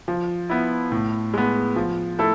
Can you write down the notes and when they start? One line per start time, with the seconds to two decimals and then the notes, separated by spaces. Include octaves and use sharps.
0.08 F3
0.49 B3 E4
0.92 A2
1.34 G#3 B3
1.76 F3
2.19 A3 E4 A4